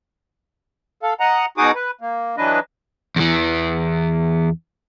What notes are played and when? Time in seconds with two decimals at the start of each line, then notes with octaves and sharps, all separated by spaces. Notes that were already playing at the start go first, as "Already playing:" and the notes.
1.03 A4 F5
1.20 D#5 F#5 A#5
1.58 B2 D#4 F#4 G#4 D6 D#6
1.75 B4
2.01 A#3
2.37 E3 F#3 D4 B4 D#5
3.16 E2 E3